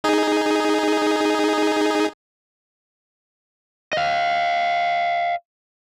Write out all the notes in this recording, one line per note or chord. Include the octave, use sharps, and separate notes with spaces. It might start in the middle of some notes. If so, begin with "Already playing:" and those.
D#4 G#4
D#5 F5